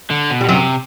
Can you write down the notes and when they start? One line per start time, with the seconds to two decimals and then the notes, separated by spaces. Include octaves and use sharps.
0.10 D3
0.30 B2
0.41 B2 G3
0.49 F#2 C3 F#3